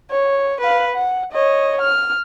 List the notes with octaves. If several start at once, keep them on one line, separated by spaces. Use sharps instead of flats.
C#5
B4 F5
F#5
C#5 D#5
F6